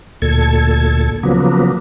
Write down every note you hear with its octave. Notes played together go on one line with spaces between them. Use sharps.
D2 A#2 A4 G#6
C#3 F3 F#3 A#3 B3